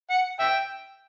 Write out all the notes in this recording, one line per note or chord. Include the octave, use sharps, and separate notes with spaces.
F#5
E5 G5